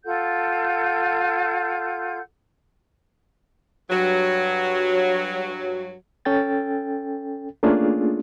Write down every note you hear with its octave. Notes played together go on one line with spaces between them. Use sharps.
F4 A4 F#5 G6
G2 F#3
C#4 A4 G5 A6
A3 A#3 C#4 D4 F4 G#4